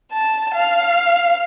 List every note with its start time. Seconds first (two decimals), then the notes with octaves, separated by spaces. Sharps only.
0.11 A5
0.54 F5